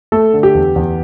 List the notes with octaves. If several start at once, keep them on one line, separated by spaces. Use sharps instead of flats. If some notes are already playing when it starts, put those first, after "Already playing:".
A3 A4
D3
G4
E2
E2